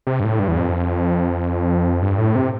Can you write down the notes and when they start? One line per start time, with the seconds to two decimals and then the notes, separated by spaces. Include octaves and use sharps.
0.07 C3
0.20 G2
0.24 A2
0.39 G2
0.48 E2
0.57 F2
2.02 G2
2.18 A2
2.35 C3